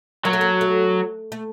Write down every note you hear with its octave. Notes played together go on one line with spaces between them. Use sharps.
F#3 A#3
A3
A#3
A3
A3